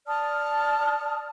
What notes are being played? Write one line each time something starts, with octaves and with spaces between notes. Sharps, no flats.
D5 A5 D#6 F6